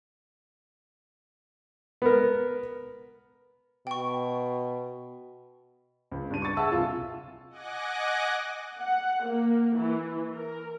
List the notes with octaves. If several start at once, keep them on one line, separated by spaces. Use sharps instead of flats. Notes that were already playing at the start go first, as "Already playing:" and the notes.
B3 A#4
B2 G5 C#6
C#2
G2 D4 D#7
C#6 A6
G#4 E5 F#5 A5 E6
C2 F4
D#5 F#5 G#5 D6 F#6 A#6
F#5
A#3
E3
A#4